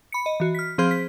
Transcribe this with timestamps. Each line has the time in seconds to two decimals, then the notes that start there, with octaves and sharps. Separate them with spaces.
0.12 B5 C#7
0.26 D#5
0.40 E3 F#4
0.55 F6 B6
0.78 F3 C4 G#4 C5 C6 F6
0.91 B6